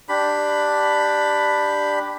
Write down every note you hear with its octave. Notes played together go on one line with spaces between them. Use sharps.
D4 G4 B5